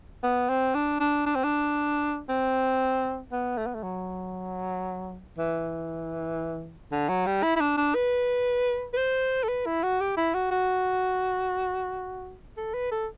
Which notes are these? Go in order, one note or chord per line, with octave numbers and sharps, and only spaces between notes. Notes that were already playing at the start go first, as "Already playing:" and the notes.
B3
C4
D4
D4
D4
C4
D4
C4
B3
A3
B3
A3
F#3
E3
D3
F#3
G3
E4
E4
D4
D4
B4
B4
C5
A4
B4
E4
F#4
G4
E4
F#4
F#4
A4
B4
A4